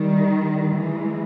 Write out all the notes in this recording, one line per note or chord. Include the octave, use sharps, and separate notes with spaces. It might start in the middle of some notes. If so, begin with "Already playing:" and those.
Already playing: D#3 G3
E3 G#3